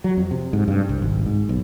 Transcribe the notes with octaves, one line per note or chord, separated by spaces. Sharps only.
F#3
F2
C3
G#2
G2
C2
G#1
G#2
B1